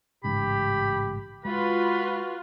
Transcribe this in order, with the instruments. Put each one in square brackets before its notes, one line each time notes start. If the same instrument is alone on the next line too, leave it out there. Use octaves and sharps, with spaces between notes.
[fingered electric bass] A1 G#2 C#3 [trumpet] G4 [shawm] B5
[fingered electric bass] G#3 [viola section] F4 B4 [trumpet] F#4 [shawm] B5